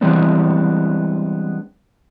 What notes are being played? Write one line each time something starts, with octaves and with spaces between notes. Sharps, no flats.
E3 G3 G#3 B3 C4 D4